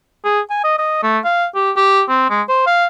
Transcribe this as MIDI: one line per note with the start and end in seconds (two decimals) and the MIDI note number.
0.25 0.40 68
0.50 0.60 80
0.64 0.78 75
0.78 1.02 75
1.03 1.18 57
1.24 1.46 77
1.55 1.71 67
1.76 2.02 67
2.09 2.26 60
2.30 2.41 56
2.49 2.65 72
2.67 2.87 77